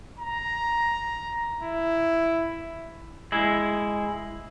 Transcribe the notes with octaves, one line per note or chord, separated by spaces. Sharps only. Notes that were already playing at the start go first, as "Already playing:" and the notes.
A#5
E4
G#3 E4